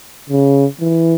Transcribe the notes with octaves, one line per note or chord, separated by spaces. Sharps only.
C#3
E3